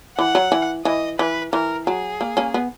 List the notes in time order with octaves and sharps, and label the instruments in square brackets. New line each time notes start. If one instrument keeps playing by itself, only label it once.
[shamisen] E3 [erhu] F#5
[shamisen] F#3
E3
[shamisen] E3 [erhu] D#5
[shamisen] E3 [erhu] B4
[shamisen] E3 [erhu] A#4
[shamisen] F#3 [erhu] G#4
[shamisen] A#3
A#3 C#4
B3